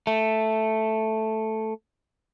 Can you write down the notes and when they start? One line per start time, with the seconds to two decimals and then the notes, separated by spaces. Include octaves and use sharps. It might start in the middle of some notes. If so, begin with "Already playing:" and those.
0.07 A3